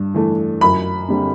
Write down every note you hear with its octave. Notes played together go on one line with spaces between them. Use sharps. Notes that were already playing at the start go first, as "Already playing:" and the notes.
Already playing: G2
E3 A3
F#2 B5
D3 G3 C4